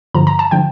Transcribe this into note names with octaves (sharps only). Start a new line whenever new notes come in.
G2 D3 F3 A#5
A#5
A5
D3 F3 G5